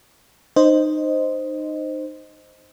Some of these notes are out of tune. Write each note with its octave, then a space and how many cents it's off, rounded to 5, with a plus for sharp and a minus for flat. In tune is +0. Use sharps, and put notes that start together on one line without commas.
D#4 -25 C5 +0 D#5 +0